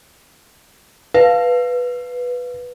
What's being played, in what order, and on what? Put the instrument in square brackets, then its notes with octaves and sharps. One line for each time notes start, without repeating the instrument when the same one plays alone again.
[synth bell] B4 [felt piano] F5